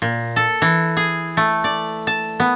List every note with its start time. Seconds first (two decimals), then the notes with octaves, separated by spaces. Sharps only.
0.02 A#2
0.36 A4
0.62 E3
0.97 G#4
1.37 A3
1.64 D5
2.07 A5
2.40 B3